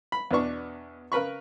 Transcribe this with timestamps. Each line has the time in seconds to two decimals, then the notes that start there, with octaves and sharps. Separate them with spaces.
0.12 B5
0.31 E2 B2 B3 D4 C#6
1.12 C#3 A#4 B4 B5 C#6